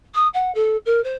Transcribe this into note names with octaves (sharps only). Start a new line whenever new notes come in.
D#6
F#5
A4
A#4
C5